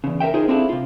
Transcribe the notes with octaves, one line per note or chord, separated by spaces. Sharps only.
E2 C#3
A#4 C#5 E5 G5
D#4 F4 G#4 A#4 C5 D#5
C4 D4 E4 F4 G#4 A4
C3 F4